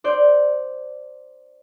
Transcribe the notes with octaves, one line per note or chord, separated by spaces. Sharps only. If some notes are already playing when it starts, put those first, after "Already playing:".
C5 D5 G6